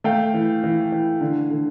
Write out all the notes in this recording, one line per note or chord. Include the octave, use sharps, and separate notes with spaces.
A3 F5 G5
E3
E3
E3
D3
D3